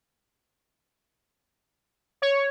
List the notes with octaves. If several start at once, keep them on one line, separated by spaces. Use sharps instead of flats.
C#5